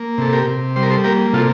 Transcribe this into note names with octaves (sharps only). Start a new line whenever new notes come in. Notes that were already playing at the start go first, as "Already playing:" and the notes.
Already playing: A#3
C3 A4
G4 A#4
C3
G3 C5
A#4
A4 C5
A#3 G4 A#4
C3 F4 A4